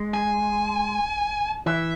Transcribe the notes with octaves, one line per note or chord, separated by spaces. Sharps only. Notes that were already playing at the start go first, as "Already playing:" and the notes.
Already playing: G#3
G#5
E3 E5